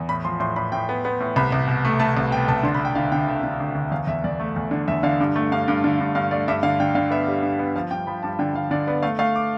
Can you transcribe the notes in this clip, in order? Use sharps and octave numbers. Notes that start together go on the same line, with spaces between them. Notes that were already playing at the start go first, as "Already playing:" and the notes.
Already playing: E2
A2 B5
F3 C6
A2 C6
A2 B5
A2 G5
B3
B3
A2
C2 B5
C2
B2
A3
A3 A5
C2
B2 G5
C2 A5
D3 C6
B5
D2
G5
D3 F5
D3 G5
D2 E5
D3
D2
D2
E2 F5
E2 E5
E2 D5
A3
E2
D3
E2 E5
D3 F5
G2
A3
G2 F5
G2
D3
G2
G2 F5
A3 D5
G2 E5
D3 F5
D3 G5
D3 F5
B3 E5
G3
G2
B3
F3 F5
G2 G5
F3 B5
G2 A5
D3 G5
D3 F5
D3 D5
B3 D5
A3 F5
A3 F5
D6